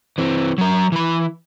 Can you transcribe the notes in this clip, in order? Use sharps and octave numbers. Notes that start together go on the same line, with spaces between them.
E3 C4
F#3 A#4
E3 B5